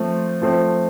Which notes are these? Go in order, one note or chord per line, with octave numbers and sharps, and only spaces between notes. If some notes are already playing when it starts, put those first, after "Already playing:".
Already playing: F3 A3 C4
F3 A3 C4